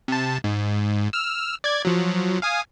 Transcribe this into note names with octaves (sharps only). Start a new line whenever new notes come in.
C3 A5
G#2
E6 F6
D5 G#6
F3 F#3
F5 G#5 D#6